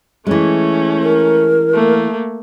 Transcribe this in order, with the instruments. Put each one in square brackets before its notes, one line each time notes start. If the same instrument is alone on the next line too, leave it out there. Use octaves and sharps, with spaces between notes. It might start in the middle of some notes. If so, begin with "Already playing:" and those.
[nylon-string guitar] E3 G#3 [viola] A3 C#4
[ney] A#4
[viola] A3 A#3